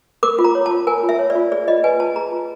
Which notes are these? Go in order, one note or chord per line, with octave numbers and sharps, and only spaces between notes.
A#4 D6
F4
A#5
C#5
A5
F4
A#4 G#5
F4
E5
C#5
D5
F4
G#4 D5
F4 D#5
B4 G#5
F4 A5
G#4 A#5
F4